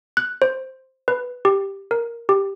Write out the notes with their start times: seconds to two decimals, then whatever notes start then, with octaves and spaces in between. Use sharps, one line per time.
0.17 F#6
0.42 C5
1.08 B4
1.45 G4
1.91 A#4
2.29 G4